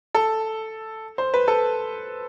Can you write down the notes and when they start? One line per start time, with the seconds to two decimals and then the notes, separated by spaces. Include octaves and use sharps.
0.15 A4
1.18 C5
1.34 B4
1.48 A4